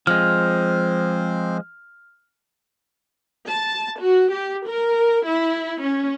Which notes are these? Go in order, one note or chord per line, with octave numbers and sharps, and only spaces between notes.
F3 G#3 C4 C5 F6
A5
F#4
G4
A#4
E4
C#4